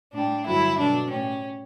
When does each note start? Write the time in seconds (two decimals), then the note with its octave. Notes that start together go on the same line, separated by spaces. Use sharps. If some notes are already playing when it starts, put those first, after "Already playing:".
0.13 A2 G3 D4
0.45 G2 D3 F#3 A3 E4
0.78 B2 F#3 A3 D4
1.10 A2 G3 C#4